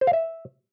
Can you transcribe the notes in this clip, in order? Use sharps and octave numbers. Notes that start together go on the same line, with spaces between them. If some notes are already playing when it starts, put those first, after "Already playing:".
C5
F5
E5